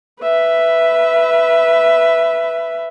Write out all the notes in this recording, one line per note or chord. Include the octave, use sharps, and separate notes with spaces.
B4 E5